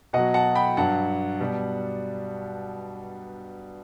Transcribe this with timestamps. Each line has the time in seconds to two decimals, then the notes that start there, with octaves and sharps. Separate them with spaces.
0.13 B2 F#3 D#5 F#5
0.34 F#5 A5
0.55 G5 B5
0.77 G2 F#3 F#5 A5
1.40 B2 G3